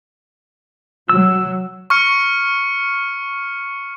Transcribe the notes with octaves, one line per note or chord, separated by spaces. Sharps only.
F#3 E6
C#6 F6 C#7